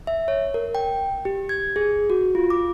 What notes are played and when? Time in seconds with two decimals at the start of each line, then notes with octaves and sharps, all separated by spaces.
0.07 E5
0.28 C#5
0.54 A#4
0.75 G5
1.25 G4
1.49 G#6
1.76 G#4
2.10 F#4
2.35 F4
2.50 D6